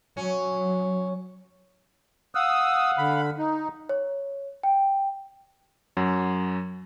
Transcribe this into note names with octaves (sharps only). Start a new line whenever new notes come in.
F#3 C#4
F5 F#5 D#6 E6
D3 B5
D#4
C#5
G5
F#2 F#3